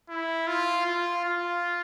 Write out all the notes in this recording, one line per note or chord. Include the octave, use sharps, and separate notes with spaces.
E4
F4
F4
F4